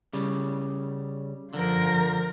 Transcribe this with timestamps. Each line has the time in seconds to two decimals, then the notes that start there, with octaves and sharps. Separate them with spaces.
0.13 C#3 G3
1.53 D3 F3 A#4